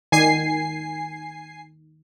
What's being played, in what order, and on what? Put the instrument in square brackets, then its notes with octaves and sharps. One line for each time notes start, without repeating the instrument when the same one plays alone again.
[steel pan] D#3 [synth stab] G#5 C7